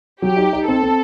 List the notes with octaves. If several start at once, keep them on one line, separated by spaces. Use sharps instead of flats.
F#3 G4
D#4
D#4
C4 A4
C4